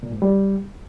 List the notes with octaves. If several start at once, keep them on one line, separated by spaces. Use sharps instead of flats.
A#2
G#2
G3